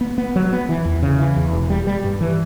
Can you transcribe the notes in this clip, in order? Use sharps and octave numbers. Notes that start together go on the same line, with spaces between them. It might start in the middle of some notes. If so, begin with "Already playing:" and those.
B3
B3
F#3
B3
E3
E2
C#3
E3
E2
E1
G3
G3
G2
E3